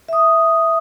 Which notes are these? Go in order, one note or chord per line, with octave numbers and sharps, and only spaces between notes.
E5 D#6